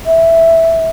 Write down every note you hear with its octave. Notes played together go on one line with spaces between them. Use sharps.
E5